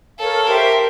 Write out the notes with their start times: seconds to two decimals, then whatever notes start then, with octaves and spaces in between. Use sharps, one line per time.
0.19 A4 A#4 C#5 F5 A5
0.47 G4 A#4 C5 E5 G5